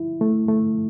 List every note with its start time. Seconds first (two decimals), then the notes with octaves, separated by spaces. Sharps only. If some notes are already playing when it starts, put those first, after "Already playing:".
Already playing: E4
0.21 A3
0.48 A3